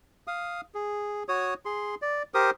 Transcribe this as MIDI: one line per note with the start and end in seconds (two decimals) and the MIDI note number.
0.27 0.61 77
0.27 0.61 87
0.75 1.23 68
1.29 1.54 66
1.29 1.54 73
1.29 1.54 87
1.65 1.95 68
1.65 1.95 84
2.02 2.23 74
2.34 2.51 67
2.34 2.51 70
2.34 2.51 72
2.34 2.51 87